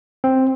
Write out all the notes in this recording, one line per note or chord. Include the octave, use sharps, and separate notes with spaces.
C4